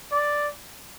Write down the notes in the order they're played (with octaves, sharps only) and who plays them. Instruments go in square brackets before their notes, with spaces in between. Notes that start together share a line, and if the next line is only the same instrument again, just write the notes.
[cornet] D5